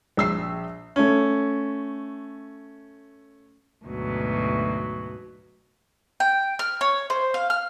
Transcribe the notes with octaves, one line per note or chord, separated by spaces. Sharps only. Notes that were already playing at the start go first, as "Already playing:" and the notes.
A#1 E6 C7
A3 C#4
D2 G#2 B2 F#3
G5
F6
C#5
C5
F5
F6